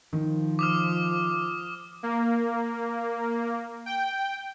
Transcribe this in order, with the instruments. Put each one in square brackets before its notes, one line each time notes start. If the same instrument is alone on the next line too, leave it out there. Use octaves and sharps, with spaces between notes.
[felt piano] D#3 [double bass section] F3
[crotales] D6 D#6 F6
[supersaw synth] A#3
G5